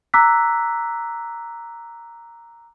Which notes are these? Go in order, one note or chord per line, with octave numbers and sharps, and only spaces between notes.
A#5 D6 E6 F#6 B6